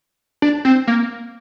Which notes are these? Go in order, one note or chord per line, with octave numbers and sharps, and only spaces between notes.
D4
C4
A#3